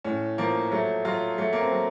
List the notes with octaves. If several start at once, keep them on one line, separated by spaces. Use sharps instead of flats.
A2 C#4
F3 A#3
F#3 A3
F#3 F4
F#3 A3
A#3
C4
F#3